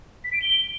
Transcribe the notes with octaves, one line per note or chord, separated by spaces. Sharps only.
B6
D7
G7